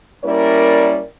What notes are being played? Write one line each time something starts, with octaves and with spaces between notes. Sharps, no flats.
G3 A#3 C#4 E4 A#4 D5